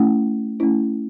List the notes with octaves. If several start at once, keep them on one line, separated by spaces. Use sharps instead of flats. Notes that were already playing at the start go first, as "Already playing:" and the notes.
Already playing: A3 C#4 E4
A3 C#4 E4